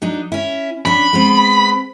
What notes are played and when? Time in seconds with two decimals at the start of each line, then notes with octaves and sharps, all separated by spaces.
0.02 F#3 D4 D#4
0.32 C#4 E4
0.85 C#4 D4 B5
1.13 G#3 B3 C4